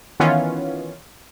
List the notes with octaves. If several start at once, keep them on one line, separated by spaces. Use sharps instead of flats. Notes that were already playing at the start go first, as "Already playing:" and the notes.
D#3 E3 B3 C#4 F4